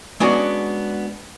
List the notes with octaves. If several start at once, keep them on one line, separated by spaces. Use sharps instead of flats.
G#3 B3 C#4 D4 F#4 G#4